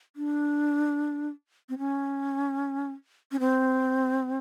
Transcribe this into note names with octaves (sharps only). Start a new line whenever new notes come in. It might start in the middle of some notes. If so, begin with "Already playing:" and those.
D4
C4
C#4
C#4
C4